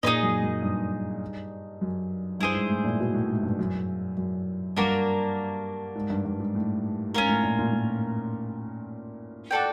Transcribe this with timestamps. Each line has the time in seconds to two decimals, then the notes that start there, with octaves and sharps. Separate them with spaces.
0.03 A#2 D#4 G#4 B4 D#5
0.23 F#2
0.43 F#2
0.62 G2
1.81 F#2
2.40 G2 E4 G#4 C5
2.54 G#2
2.69 A2
2.84 A#2
3.00 B2
3.14 A2
3.30 G#2
3.43 G2
3.59 F#2
4.18 F#2
4.76 G2 A#3 D4 F#4 A#4
5.95 G#2
6.10 G2
6.25 G2
6.40 G#2
6.55 A2
7.13 G#2 C#4 F4 A#4
7.29 A2
7.43 A#2
7.59 A#2
7.73 A2
9.51 F#4 A4 D5 G5